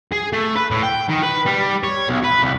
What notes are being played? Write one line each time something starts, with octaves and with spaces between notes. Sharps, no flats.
G#4
A3
B4
A2
G5
D#3
B4
G3
C#5
B1
B4
C2